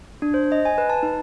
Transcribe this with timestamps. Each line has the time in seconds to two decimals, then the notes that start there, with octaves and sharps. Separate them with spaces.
0.22 D4
0.34 C5
0.52 D#5
0.65 G#5
0.78 B4
0.90 A5
1.03 D#4